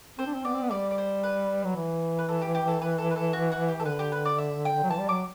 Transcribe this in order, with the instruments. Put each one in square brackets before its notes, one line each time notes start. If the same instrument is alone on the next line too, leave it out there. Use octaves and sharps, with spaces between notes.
[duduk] C4 [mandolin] C5
[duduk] D4
C4
[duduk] B3 [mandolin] D5
[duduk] C4
B3
[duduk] G3 [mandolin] D5
[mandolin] D5
C5
B4
[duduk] F#3
E3
[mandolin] B4
A4
G4
G4
A4
B4
A4
B4
A4
F#4
F#4
G4
A4
[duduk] D3 [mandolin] B4
[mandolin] G4
B4
D5
E5
G5
[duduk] F#3
[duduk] E3 [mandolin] A5
[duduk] G3
[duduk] F#3 [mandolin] D6